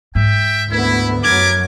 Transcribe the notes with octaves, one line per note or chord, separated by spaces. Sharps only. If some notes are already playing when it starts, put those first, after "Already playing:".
G#2 E5 G5
D2 A3 B3 E4
F#2 F#3 A#4 B5 D6 G#6